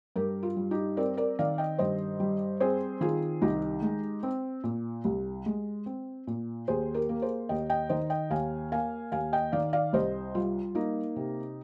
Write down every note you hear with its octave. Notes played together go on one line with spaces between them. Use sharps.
G2 G4 A#4
F4
G3
D#4 G4
C4 A#4 D5
A#4 D5
D#3 D5 F5
D#5 G5
G2 C5 D#5
G3
C4 G#4 C5
D#3 F4 G#4
C2 D#4 G4
G#3
C4
A#2
C2
G#3
C4
A#2
D#2 G#4 C5
G4 A#4
A#3
G#4 C5
D#2 D#5 G5
D#5 G5
D#3 C5 D#5
D#5 G5
D#2 F5 G#5
A#3 F5 G#5
D#2 F5 G#5
D#5 G5
D#3 D5 F5
D5 F5
C2 C5 D#5
G3 F4
A#3 D#4
C3